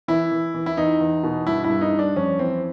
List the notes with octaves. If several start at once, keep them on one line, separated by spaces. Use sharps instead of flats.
E3 E4
E3
E3
E4
E2 D#4
E2
B2
G2 E4
E4
G2
D#4
G2
D4
F2 C#4
E3 C4